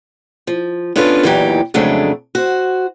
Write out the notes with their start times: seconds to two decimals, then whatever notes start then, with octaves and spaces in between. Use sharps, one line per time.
0.47 F3
0.96 B3 C#4 D4 F4 A4 B4
1.23 E2 A#2 E3 F#3 D#4 G4
1.74 F2 C#3 F#3 G#3 A3 D4
2.35 F#4 C5